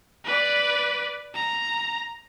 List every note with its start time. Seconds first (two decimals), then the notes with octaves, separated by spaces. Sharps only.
0.25 B4 D5
1.35 A#5